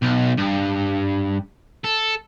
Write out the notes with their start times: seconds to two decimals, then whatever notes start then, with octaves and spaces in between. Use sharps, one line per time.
0.02 B1
0.37 G2
1.84 A4